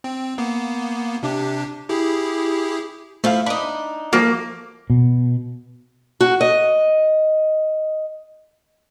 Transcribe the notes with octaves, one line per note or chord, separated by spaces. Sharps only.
C4
A#3 B3
C3 D4 G4
E4 G4 G#4
F3 A3 E4 F5
D4 D#4 B5 D6 D#6
F3 G3 A#3 F#4
B2
F#4
D#5